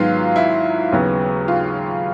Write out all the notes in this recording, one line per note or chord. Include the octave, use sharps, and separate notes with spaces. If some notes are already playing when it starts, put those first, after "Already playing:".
Already playing: G#2 D#3 F#3 B3 F4
E4
D#2 C#3 F#3 B3
F4